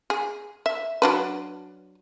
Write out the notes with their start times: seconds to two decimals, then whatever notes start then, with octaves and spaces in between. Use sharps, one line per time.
0.10 G#4
0.66 E5
1.02 F#3 D4 B4